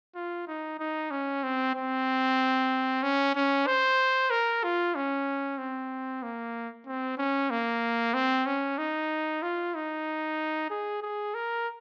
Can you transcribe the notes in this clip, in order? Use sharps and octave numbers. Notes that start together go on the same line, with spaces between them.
F4
D#4
D#4
C#4
C4
C4
C#4
C#4
C5
A#4
F4
C#4
C4
A#3
C4
C#4
A#3
C4
C#4
D#4
F4
D#4
G#4
G#4
A#4